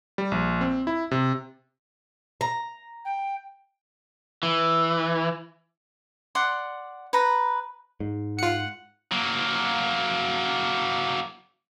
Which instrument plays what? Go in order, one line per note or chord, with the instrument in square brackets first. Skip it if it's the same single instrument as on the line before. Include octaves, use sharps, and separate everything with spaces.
[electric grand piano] G3
A#1
C4
E4
C3
[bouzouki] A#5
[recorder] G5
[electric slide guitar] E3
[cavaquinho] D5 F#5 C6
B4 A#5
[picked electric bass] G#2
[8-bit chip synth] F4 C#7 [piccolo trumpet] F#5
[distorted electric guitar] F#3 A#3